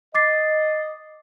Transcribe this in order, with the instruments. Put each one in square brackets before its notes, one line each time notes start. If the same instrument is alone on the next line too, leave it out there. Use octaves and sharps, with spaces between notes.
[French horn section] D#5 [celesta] D6 A6 C7